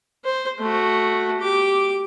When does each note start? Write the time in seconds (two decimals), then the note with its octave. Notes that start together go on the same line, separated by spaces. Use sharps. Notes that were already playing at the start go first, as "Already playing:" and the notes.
0.24 C5
0.59 A3 F#4
1.40 G4 D6